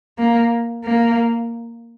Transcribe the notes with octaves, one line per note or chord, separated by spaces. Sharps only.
A#3
A#3